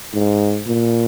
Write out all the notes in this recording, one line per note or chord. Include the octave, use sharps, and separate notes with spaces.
G#2
A#2